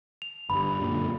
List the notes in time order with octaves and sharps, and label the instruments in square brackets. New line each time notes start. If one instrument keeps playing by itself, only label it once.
[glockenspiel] F7
[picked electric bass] G1 G2 [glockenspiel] B5
[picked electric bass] F#2 A#2 D3